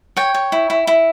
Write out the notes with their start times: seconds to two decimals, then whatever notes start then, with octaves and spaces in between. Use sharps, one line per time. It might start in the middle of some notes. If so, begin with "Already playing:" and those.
0.17 C#5 G5
0.34 C#5
0.52 E4
0.70 E4
0.87 E4